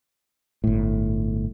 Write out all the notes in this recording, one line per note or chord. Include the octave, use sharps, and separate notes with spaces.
G1 A2